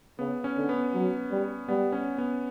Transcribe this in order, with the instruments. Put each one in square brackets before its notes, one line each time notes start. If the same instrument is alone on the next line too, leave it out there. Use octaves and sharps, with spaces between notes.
[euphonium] C#3 [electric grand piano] B3
[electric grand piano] C#4
[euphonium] D3
[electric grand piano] B3
[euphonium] F#3
G3
[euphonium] G3 [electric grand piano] B3
[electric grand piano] C#4
B3